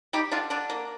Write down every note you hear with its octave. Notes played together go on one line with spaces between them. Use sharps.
G3 D#4 G4
D3 D4 F4
D3 D4
A#3